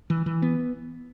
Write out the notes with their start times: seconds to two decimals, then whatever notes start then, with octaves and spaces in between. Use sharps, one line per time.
0.10 E3
0.26 E3
0.42 B3